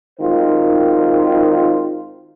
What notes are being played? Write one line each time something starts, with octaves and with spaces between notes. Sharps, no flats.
G#1 D#3 F4 C5